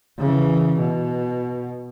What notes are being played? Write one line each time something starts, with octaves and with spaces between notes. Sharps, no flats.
C#3 E3
B2